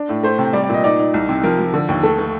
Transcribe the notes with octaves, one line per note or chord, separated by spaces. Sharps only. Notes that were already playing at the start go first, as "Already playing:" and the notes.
Already playing: D4
A2
A3 C5
C3
G3 D5
D5
A#2 D#5
D#4 D5
D#4
C2
C3
F3 A#4
F3
D3
D#2
A3 A4
A3